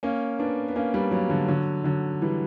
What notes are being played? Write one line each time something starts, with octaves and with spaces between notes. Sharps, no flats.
A#3 C#4
B3 D4
B3
A#3 C#4
G3 B3
F#3 A#3
D3 F#3
D3 F#3
D3 F#3
E3 G3